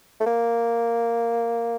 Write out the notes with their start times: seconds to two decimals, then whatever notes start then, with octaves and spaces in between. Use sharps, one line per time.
0.20 A3
0.26 A#3